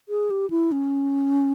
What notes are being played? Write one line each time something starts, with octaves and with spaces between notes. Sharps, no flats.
G#4
G4
E4
C#4